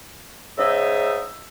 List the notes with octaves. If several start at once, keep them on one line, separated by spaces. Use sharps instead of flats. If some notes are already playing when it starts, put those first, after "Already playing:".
G#2 C#3 D#4 E5